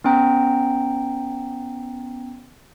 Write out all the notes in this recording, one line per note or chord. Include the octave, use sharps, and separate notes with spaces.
B3 C#4 G5 A#5